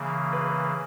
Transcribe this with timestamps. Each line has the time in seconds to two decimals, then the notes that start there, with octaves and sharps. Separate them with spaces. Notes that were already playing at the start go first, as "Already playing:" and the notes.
Already playing: C#3 E3 A#3 G#4
0.33 B4